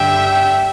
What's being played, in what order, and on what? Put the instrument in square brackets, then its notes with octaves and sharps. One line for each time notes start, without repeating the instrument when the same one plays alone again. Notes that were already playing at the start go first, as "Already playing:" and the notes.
Already playing: [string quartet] G2 D3 G3 E5 G5